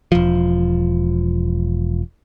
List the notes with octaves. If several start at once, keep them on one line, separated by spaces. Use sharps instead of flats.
E1 F3